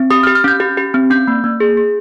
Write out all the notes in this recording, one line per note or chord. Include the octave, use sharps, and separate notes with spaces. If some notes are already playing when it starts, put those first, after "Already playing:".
Already playing: C4
G4 D#6
F6
G4
F6
C#4 G6
G4
G4
C4
C#4 G6
A#3
A#3
G#4
G#4